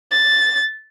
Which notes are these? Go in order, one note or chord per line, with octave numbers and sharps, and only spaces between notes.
A6